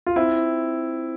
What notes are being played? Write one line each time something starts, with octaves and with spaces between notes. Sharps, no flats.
F4
C4 E4